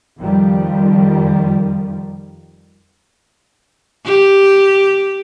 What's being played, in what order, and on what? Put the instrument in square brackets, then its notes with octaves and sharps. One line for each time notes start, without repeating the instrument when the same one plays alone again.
[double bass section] F2 D#3 F3 G3
[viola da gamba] G4